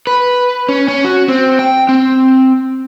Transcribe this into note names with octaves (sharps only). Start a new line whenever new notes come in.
B4
C#4
C#4
F#4
C4
G5
C4